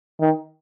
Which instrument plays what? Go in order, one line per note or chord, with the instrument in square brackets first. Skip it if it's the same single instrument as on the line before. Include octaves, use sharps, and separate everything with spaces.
[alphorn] D#3